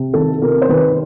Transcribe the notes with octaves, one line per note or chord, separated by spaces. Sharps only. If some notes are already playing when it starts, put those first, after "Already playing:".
Already playing: C3
D#3 A4
C3 A#4
C5
D#3 B4